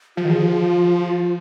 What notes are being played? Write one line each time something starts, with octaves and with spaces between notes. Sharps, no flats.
F3 F4
D#3
F3 G#4
F4
F4